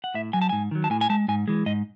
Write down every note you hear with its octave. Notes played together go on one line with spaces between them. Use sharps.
F#5
A2 E5
F#3 G#5
A5
G#2 G#5
D#3 F#3
A5
A2 G#5
G#5
G#3 A5
G#2 G#5
E3 G#3
G#2 D#5